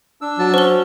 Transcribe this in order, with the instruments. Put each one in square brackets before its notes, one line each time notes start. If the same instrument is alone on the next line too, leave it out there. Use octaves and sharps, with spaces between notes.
[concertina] D4 E6
[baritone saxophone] F#3 [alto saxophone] A5
[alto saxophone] C#4 [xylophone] C5 G7